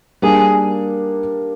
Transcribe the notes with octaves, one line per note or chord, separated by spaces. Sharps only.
G3 A#3 D4 G#4